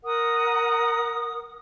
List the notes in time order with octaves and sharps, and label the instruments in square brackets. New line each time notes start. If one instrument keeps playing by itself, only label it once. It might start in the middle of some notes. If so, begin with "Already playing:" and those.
[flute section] A#4 F#5 D#6